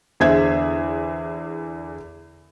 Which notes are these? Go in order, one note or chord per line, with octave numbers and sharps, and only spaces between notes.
E2 D3 G#4 C5 E5 G#6